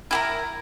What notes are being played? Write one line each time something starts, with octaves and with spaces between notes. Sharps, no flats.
E4 G4 A#4